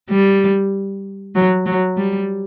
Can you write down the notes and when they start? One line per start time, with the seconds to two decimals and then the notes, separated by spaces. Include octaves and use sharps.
0.10 G3
1.35 F#3
1.66 F#3
1.97 G3